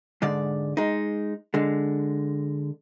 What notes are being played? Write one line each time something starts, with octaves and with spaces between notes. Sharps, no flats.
G#2 D3 G#3 D5
G#3 D#4
D3 G#3